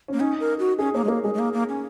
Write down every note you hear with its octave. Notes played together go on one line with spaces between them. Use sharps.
A#3 C#4
C#4 D#4
A#4
F#4
C#4 G#4
A#3 C#5
G#3
A#3 A#4
G#3 G#4
G#3
A#3
A#3
C#4